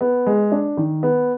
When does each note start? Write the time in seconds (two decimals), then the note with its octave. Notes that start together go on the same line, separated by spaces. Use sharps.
0.01 B3
0.26 G#3
0.52 D4
0.77 D#3
1.03 B3